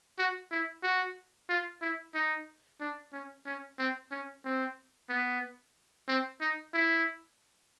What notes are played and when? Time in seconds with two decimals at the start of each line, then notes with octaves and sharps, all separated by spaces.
0.19 F#4
0.52 E4
0.83 F#4
1.49 F4
1.82 E4
2.15 D#4
2.80 D4
3.13 C#4
3.46 C#4
3.79 C4
4.12 C#4
4.45 C4
5.10 B3
6.08 C4
6.41 D#4
6.74 E4